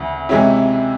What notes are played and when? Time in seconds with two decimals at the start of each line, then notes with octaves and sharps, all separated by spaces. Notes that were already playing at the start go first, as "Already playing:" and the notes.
Already playing: D2 C#3 E3
0.29 C3 E3 G#3 C#4 E4